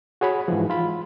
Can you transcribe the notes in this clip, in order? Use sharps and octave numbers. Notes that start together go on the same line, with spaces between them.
F#4 G#4 C#5 B5
G#2 E3 F3
F4 B5